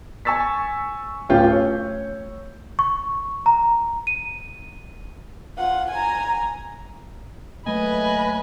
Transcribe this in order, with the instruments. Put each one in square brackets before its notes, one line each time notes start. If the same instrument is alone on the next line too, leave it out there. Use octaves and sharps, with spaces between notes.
[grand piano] G#5 C#6 E6 A6 B6
D1 C#4 F4 G4 G6
C#5
[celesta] C#6
A#5
D#7
[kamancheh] F4 F#5
G#5 A#5
[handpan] F#3 A3 A#3 [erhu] B4 [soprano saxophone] D#5 [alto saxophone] G#5